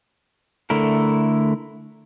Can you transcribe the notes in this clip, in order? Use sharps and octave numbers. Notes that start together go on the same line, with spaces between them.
D3 A3 E4 A#4